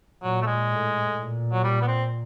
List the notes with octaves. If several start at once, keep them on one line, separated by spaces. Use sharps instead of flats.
A#2 F#3
A3
G#3
A2
A#2
F#3
G3
B3
C4